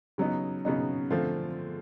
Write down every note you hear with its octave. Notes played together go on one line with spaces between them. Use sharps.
C#3 F#3 B3 D#4
C#3 F#3 B3 D#4
D3 F3 A3 C4 F4